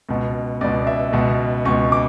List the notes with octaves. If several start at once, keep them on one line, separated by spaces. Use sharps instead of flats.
C#2 B2
C#2 B2 D5
E5
C#2 B2
C#2 B2 C#6
D6